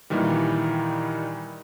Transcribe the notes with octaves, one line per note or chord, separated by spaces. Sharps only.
A#2 D#3 E3 G3